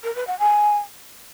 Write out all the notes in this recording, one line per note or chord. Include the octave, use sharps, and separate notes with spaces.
A#4
B4
F#5
G#5